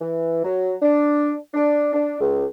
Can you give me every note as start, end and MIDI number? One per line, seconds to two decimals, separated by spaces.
0.01 0.43 52
0.44 0.75 54
0.82 1.34 62
1.54 1.91 62
1.93 2.20 62
2.21 2.46 37